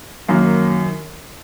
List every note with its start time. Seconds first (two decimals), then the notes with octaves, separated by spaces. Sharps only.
0.28 F#2 D#3 F#3 A#3